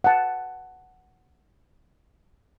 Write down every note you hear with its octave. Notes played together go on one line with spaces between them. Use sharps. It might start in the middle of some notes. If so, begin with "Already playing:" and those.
F#5 A5